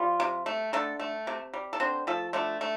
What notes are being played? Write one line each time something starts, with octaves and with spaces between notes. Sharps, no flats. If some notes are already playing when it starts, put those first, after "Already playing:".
Already playing: F3 G3 F4
C3
A3
D3 A3 A4
A3
C3
G3
A4
D3 C4 C5
F3 A3 A4
D3 A3 A4
A3